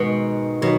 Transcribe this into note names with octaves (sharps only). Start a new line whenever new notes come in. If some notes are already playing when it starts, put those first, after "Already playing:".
Already playing: G#2 B2 D#3 G#3
B2 D#3 F#3